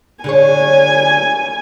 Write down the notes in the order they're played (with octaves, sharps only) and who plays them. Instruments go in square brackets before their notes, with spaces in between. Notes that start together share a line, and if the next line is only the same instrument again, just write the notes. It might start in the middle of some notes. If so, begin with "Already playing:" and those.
[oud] D3 G#4 C#5 [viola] G#5